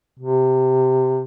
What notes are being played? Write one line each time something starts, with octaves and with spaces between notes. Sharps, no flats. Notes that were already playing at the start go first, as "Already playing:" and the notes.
C3